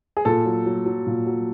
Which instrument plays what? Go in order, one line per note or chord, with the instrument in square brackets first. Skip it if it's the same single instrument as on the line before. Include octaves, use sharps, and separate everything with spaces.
[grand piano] G#4
A#2 A4
F#3
F#3
F#3
A#2
F#3